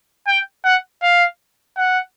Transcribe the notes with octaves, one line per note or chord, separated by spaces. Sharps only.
G5
F#5
F5
F#5